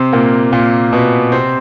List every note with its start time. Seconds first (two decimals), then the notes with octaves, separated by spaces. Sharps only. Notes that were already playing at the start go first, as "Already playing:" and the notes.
Already playing: C3 C4
0.13 A#2 A#3
0.52 A#2 A#3
0.93 B2 B3
1.32 C3 C4